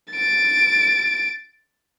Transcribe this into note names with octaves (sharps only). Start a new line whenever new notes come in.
A6 D7